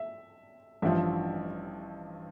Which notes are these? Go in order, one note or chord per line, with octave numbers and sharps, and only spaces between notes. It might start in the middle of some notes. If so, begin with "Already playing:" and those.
Already playing: E5
A1 G2 F3 E5